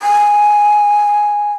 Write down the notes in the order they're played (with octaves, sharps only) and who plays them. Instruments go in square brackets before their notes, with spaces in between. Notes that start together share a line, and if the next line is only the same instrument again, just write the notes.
[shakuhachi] G#5